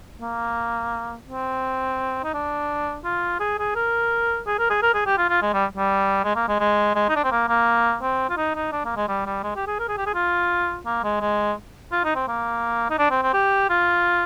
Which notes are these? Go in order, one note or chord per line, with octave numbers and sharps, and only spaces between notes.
A#3
C4
D#4
D4
F4
G#4
G#4
A#4
G#4
A#4
G#4
A#4
G#4
G4
F4
F4
G#3
G3
G3
G#3
A#3
G#3
G#3
G#3
D#4
D4
C4
A#3
A#3
C4
F4
D#4
D#4
D4
A#3
G#3
G3
G3
G#3
G4
G#4
A#4
G#4
G4
G#4
F4
A#3
G#3
G#3
F4
D#4
C4
A#3
D#4
D4
C4
C4
G4
F4